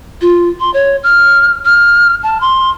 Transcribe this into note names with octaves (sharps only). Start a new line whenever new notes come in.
F4
C6
C#5
F6
F6
A5
C6